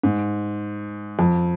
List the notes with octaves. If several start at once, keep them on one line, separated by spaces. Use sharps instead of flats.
G#2
F2